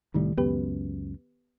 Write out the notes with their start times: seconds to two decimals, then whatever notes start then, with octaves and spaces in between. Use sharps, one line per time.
0.15 C2 A2 D#3 G3
0.38 C#2 F#2 B3 G4 B4